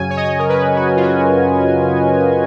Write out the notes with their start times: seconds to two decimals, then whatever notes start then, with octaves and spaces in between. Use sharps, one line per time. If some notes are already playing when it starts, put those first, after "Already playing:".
Already playing: F#2 C#3 F#3 C#4 G#5
0.10 C#5
0.17 D#5
0.24 C#5
0.39 A#4
0.49 B4
0.76 F#4
0.97 F4
1.03 F#4